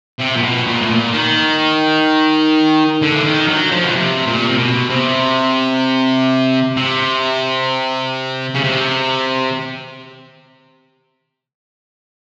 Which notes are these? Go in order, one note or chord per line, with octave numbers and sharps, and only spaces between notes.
C3
A#2
B2
A#2
A2
A#2
D#3
D3
E3
D#3
F#3
F3
B2
C3
A#2
C3
B2
C3
C3
C#3
C3